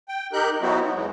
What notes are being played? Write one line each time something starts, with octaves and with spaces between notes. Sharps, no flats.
G5
D#4 G4 A#4 F#6 G6
F#3 B3 C4 D#4 E4 F#4
B3
E2 E3 F#3 G#3